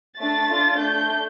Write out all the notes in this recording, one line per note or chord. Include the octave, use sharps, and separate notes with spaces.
A3 D4 A4 A6
D4 F4 A4
A3 D4 A4 G6